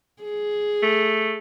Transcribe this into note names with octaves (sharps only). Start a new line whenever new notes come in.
G#4
A3